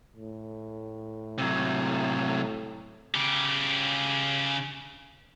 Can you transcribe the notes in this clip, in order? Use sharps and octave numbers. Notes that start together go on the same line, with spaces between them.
A2
C3 F#3
C#3 G4